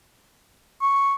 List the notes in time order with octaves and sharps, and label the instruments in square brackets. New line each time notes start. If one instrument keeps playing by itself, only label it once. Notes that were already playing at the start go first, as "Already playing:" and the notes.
[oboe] C#6